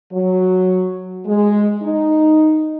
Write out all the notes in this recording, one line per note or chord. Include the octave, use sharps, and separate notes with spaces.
F#3
G#3
D#4